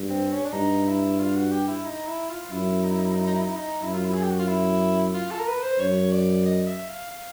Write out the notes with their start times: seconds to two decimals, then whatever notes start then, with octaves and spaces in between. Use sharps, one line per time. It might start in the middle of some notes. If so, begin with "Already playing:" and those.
Already playing: G2
0.09 C4
0.32 C#4
0.45 D4
0.53 G2 D#4
0.87 E4
1.19 F4
1.36 F#4
1.52 G4
1.68 E4
1.85 D#4
2.07 E4
2.29 F4
2.51 F#2 E4
2.84 D#4
2.90 E4
2.98 D#4
3.05 E4
3.12 D#4
3.20 E4
3.27 D#4
3.34 E4
3.41 D#4
3.48 E4
3.56 D#4
3.82 F#2 E4
3.94 F4
4.04 E4
4.13 G#4
4.22 G4
4.31 F#4
4.39 F4
4.47 E4
5.14 F4
5.31 A4
5.40 A#4
5.47 B4
5.63 C5
5.79 F#2 C#5
6.12 D5
6.46 D#5
6.67 E5
6.89 F5
7.11 F5